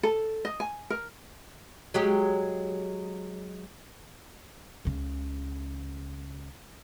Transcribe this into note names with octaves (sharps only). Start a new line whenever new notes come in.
A4
D#5
G#5
A#4
F#3 G#3 G4
C#2 C#3